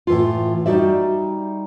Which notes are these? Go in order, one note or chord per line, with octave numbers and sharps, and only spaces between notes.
A2 E3 F4
G3 D#4 F#4 D5 E5